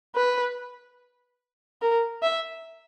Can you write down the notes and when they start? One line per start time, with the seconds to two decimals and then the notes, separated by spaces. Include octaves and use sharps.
0.15 B4
1.82 A#4
2.22 E5